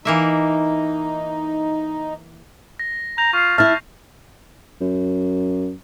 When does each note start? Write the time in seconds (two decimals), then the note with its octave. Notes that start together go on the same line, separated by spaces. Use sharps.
0.05 E3 A#3 D#4 E5
2.79 A#6
3.18 A#5 G6 F7
3.33 F4 C#6 C7
3.58 E4 E5 A5 F6
4.81 F#2